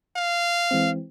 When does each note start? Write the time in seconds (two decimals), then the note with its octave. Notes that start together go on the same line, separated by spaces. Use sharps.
0.16 F5
0.71 E3 G#3 C4